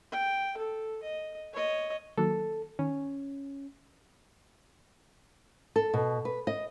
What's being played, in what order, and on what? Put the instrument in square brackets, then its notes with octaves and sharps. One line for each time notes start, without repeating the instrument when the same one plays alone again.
[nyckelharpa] G5
A4
D#5
C#5 D#5
[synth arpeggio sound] D#3 F#3 A#3 [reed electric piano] A4
[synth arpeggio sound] D#3 [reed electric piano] C#4
[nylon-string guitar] A4
B2
B4
D#5